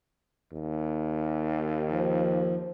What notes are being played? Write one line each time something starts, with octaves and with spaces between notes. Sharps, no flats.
D#2
F3